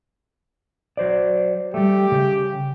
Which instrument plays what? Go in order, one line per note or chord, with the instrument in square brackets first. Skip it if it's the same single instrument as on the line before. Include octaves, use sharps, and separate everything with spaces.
[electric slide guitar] F#3 C5 D5
[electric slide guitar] G3 A3 [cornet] G4
[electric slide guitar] C#3